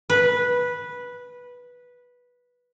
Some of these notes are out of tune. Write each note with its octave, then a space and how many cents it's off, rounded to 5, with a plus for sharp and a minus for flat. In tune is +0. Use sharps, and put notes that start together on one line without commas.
B4 -10